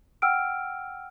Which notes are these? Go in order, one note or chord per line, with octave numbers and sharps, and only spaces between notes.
F#5 G5 E6 F6 D7